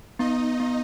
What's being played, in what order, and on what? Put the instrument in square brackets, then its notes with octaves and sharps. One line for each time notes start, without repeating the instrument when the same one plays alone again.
[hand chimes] B3 [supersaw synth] D#4 D#5
[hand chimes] B3